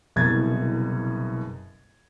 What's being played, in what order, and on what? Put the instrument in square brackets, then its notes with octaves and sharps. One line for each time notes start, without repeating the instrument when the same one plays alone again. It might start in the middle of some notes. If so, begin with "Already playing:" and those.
[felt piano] F#1 C2 B2 G#6 A6